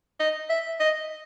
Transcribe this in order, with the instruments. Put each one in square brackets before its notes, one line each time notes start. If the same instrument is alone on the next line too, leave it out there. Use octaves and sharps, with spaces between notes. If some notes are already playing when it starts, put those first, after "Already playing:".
[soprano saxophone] D#5
E5
D#5